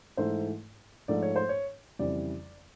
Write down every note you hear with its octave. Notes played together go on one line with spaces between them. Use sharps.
G#2 E3 A3 C5
G#2 F3 A3 D5
C#5
C5
C#5
F2 C#3 E3 G3 D5